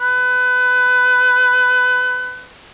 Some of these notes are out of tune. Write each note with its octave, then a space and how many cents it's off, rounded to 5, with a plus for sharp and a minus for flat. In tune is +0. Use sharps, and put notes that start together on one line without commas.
B4 +25